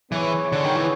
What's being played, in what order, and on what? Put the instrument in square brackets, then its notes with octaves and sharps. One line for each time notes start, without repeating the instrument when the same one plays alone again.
[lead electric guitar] E3 [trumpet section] B3 E4 G#4 C#5
[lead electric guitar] D3
D#3
E3